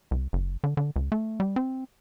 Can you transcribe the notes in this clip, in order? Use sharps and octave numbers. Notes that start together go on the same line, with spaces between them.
C2
F#1
D3
D3
C#2
A3
G3
C4